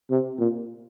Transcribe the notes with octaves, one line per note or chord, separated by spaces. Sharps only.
C3
A#2